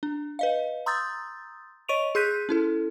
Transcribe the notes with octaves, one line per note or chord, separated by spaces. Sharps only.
D4
B4 D#5 F5
A#5 C6 D#6 E6 G6 A6
C#5 D#5 C#6 D7 D#7 F7
G#4 C6 F#6 G6 B6 D#7
C#4 E4 A4